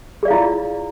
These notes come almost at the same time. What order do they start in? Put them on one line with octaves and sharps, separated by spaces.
G#4 D5 F5 E4 F4